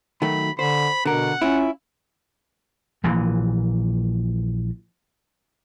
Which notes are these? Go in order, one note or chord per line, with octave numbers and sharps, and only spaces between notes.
D#3 F#3 A3 B5
D3 C5 B5
B2 D3 A#4 F#5
C#4 E4 F4
A#1 A#2 E3